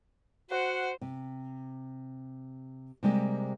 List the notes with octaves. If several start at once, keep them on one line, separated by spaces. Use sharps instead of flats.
F#4 C5 F#5
C3
C3 G3 G#3 A#3 G4